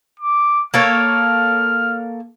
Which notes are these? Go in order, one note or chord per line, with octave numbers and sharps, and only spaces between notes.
D6
A#3 A4 C#5 F6